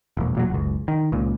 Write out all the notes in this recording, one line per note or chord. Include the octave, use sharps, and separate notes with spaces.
E1 A#1
E1 A#2 F#3
F#1 C#2
D#3
C#2 A#2